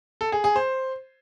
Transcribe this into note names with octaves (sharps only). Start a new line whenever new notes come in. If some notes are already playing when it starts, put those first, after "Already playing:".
A4
G#4
G#4
C5